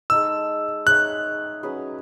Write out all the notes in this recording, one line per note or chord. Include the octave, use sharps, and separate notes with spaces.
G#3 D#4 A4 E6
D#4 G#4 C#5 E5 F#6
F#3 C#4 G#4 B4